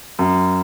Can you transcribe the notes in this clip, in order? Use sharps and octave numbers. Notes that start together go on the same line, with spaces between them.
F#2